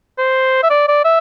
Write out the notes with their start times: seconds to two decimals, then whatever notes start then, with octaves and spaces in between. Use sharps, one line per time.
0.18 C5
0.63 E5
0.70 D5
0.88 D5
1.04 E5